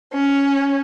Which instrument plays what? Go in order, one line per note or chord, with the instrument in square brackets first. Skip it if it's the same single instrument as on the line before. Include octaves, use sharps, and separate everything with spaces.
[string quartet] C#4